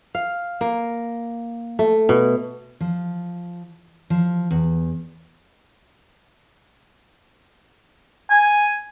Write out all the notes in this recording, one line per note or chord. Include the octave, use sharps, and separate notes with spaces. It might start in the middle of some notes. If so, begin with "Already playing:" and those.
F5
A#3
A3
B2
F3
F3
E2
G#5